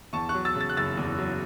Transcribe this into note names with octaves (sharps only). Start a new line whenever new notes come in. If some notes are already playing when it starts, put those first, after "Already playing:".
E2 A5 C#6
C#6 F#6
F#3
E6 A6
C#3
A6
F#6
F#1 E6 A6
E2
F#3